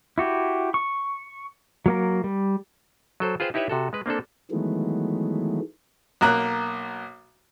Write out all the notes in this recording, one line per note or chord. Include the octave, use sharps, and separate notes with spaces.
E4 F#4 G4
C#6
F#3 A#3 A#4
G3
F#3 A4 C5
F4 G#4 B4 C5 G5
D#4 E4 G4 B4 C#5 E5
C3 F#4 A4
G#3 B4
A#3 C4 D4 A4
D#3 E3 F#3 G#3 A3 B3
B1 A#3 F#6